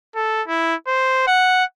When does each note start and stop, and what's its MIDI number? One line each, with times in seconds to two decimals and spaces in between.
0.15 0.42 69
0.48 0.75 64
0.88 1.25 72
1.27 1.64 78